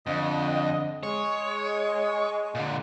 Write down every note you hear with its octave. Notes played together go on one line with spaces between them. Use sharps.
F2 D3 D#5
G#3 C#5
A#2 D3